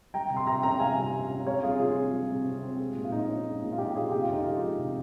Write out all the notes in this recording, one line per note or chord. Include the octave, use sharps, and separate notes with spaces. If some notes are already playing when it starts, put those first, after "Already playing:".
G3 G5 A#5
C3
C6
C3 G5 A#5
C#4 G5 A#5
G3 F5 G#5
C3
C3
C#4
G3 C#5 F5
C3 F4 G#4
C3 F4 G#4
C4
G3
C3
C3
C4
G#3
A#2
F4
A#2 D#4
C#4
G#3
A#2
F4
A#2 D#4 G4
C#4 F4 G#4
C3 G4
F4
F2 D#4
G#3 F4
F3
C3